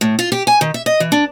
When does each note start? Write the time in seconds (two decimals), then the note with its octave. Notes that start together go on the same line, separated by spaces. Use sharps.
0.01 A2
0.19 F4
0.32 G4
0.47 G#5
0.61 D#3
0.74 E5
0.86 D#5
1.00 E3
1.12 D4